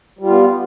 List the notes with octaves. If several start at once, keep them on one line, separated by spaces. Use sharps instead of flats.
G3 B3 F4